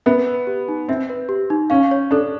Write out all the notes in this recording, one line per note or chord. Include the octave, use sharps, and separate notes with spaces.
B3 E5
B4
G4
D#4
C4 E5
B4
G4
D#4
C#4 F5
C#5
D4 A4